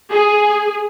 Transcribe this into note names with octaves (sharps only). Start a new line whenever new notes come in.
G#4